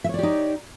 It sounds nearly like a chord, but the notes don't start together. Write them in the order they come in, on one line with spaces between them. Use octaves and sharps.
E5 C#5 D5 G4 D#4